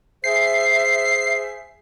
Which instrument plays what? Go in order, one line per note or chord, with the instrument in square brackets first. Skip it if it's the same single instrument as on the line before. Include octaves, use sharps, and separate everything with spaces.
[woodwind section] G#4 C5 E5 [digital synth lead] C7